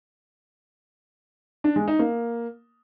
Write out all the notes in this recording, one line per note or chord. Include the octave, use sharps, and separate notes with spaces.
D4
G#3
D#4
A#3